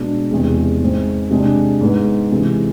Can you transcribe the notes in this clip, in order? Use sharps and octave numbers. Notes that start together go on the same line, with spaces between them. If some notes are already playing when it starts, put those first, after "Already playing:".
Already playing: B2 G#3 D4
E2 C3 G#3
G#2 G#3 C4
C3 G#3 D4
G#2 G#3 B3
C3 E3 G#3